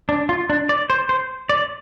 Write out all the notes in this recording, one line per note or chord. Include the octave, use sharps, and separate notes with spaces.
D4
F4
D4
D5
C5
C5
D5